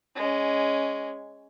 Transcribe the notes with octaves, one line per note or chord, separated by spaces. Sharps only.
G#3 C#4